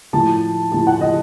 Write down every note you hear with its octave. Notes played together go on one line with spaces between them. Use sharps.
A2 F3 A5
A2 F3 A5
F#5
D#5